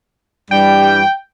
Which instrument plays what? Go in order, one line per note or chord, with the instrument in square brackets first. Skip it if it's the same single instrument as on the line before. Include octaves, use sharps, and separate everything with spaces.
[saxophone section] G2 E3 G3 [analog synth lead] G5